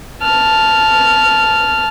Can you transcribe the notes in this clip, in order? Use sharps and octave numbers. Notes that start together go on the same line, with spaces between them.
A5 F6